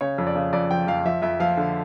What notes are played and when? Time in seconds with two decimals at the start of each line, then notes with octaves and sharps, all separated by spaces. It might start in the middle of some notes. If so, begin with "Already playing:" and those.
0.01 C#3 C#5
0.18 F2
0.27 D5
0.35 C#3
0.53 F2 D5
0.71 F3 G5
0.87 F2 F5
1.05 F3 E5
1.22 F2 E5
1.40 F3 F5
1.57 D3